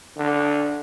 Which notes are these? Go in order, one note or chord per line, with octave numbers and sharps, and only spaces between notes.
D3